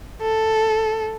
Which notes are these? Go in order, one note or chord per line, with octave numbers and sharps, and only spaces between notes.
A4